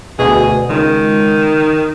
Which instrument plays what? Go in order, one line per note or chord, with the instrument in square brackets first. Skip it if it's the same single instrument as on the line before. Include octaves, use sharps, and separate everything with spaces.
[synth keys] D2 B2 [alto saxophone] G#4
[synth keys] C#2 [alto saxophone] D#3